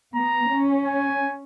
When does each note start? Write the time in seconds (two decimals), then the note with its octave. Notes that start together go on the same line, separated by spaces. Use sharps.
0.15 B3 A#5
0.50 C#4
0.85 G#5